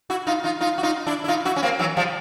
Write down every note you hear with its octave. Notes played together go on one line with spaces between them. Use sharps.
E4 F#4
D#4 F4
D#4 F4
D#4 F4
F#4
D#4 F4
D4 E4
E4
D#4 F4
E4 F#4
C#4
A#3 C4
E3 F#3
F3 G3